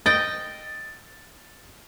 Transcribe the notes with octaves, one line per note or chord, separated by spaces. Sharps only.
D#5 G5 A6